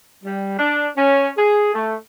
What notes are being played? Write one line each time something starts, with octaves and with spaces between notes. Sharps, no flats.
G3
D4
C#4
G#4
A3